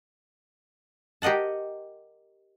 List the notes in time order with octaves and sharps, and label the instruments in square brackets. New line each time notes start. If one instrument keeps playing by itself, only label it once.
[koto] G4 A#4 D#5 F#5 A5